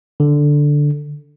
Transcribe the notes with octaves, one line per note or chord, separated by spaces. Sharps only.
D3